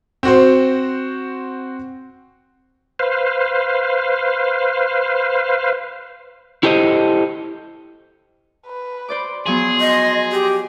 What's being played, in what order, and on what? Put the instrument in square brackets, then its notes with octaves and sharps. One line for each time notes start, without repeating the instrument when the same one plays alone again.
[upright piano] C4 F#4 C5
[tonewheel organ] B4 C5 F5
[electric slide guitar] E4 G4 A4 C5 D#5
[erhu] B4
[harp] C5 D5 D6
[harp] F3 F#3 B3 [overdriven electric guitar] G#4 [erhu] C6
[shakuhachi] D#5
G4